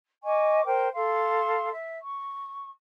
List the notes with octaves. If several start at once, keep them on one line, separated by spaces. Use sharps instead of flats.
D#5 G#5 C#6 D6
A#4 C5 G5
A4 F5 C6
E5
C#6